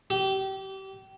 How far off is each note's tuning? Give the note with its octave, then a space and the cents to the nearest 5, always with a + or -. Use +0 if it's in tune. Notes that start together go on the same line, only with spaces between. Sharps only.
G4 -25